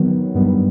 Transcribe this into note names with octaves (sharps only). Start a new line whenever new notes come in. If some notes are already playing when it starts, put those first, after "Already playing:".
Already playing: D#3 F#3 B3
G2 D#3 G3 B3